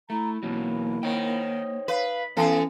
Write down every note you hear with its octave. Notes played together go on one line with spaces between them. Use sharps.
A3 E4 A#5
E2 B2 F#3 A#3
D#3 C5 C#5 G5
B4 F5
E3 B3 C#4 A4 G#5